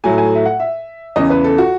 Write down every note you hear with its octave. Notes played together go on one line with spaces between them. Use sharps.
A2 F#3 A3 G#5
G#5
E5
F#5
E5
E2 C#3 E3 D#5
B4
A4
F#4